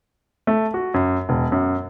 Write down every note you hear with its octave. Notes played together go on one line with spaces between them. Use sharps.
A3
F#4
F#2
E1
F#2